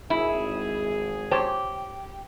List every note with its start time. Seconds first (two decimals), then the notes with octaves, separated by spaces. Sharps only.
0.10 G#1 E4 G#4
1.31 G4 C5 C#5 A5